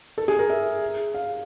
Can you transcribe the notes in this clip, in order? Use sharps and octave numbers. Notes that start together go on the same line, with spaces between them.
A4
G#4
A#4
E5
F5